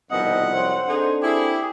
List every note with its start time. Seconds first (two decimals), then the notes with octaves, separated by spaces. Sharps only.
0.11 C2 F2 B2 D#3 C4 D#5 F#5
0.55 F#3 C4 C5
0.87 C4 D4 D#4 G#4 A4
1.23 E4 G4 G#4